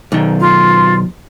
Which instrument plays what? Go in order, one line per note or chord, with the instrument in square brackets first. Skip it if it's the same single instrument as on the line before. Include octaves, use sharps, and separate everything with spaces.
[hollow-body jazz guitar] B1 D#3
[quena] F4